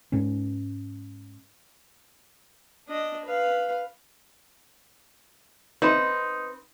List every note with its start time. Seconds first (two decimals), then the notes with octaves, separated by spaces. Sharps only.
0.12 G#2 C#4
2.88 D4 D#5
3.25 B4 F5
5.82 C4 D#4 B4